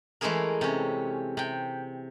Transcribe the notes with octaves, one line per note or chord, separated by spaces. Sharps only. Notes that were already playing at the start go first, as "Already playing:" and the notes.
E3 G#3 A3 E4 G#4 A#4
C3 C#4
C3 G5